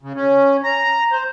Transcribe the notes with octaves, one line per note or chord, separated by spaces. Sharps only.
C#3
C#4
A#5
C5